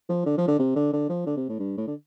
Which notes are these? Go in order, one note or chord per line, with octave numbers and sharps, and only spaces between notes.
F3
D3
F3
D3
C3
D3
D3
F3
D3
C3
A2
G2
A2
D3